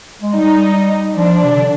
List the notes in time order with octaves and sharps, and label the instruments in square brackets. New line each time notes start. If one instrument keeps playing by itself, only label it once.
[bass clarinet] G#3
[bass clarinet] G3 [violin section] D#4
[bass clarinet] F3 [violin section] D4
[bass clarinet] C3
D3